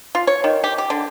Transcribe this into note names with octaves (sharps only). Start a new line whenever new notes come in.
F4
C#5
D#3
G4
G4
D3